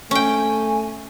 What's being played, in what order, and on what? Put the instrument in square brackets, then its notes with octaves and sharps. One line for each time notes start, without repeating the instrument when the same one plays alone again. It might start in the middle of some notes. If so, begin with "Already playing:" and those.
[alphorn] A3 [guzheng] C#4 G5 [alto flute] G#5